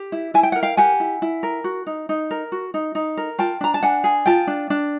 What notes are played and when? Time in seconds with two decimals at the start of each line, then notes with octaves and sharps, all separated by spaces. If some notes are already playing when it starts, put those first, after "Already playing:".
Already playing: G4
0.12 E4
0.34 E4 G#5
0.43 G5
0.52 A#4 F#5
0.63 F5 G5
0.77 G4 F#5 G#5
1.00 E4
1.22 E4
1.43 A#4
1.64 F#4
1.87 D#4
2.09 D#4
2.31 A#4
2.52 F#4
2.74 D#4
2.95 D#4
3.17 A#4
3.39 F4 G5 A5
3.61 D4 A#5
3.74 A5
3.83 D4 F#5 G#5
4.04 G#4
4.26 F4 G5 A5
4.47 D4
4.70 D4